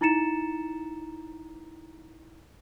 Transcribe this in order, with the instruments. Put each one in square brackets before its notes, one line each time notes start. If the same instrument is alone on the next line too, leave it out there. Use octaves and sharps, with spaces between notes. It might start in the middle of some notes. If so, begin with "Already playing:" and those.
[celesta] D#4 E4 A#5 A6 C#7 E7